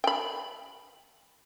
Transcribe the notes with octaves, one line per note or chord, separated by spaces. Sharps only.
G5 B5